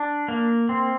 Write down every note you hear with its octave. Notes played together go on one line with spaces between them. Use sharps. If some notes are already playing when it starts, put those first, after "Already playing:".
Already playing: D4
A#3
C4